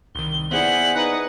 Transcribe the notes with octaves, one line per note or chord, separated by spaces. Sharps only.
C2 D#3 G7
B3 E4 G#4 C5 D5 F#5 F#7
D#4 B4 F#5